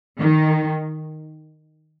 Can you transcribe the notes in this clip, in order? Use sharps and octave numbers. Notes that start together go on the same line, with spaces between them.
D#3